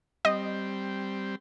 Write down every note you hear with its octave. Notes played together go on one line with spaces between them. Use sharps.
G3 C4 D#5